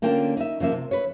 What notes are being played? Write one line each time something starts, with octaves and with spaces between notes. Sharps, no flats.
D3 A#3 C#4 F4 G5 A5
D#4 E5
C#3 F3 A#3 E5
C3
B4 C#5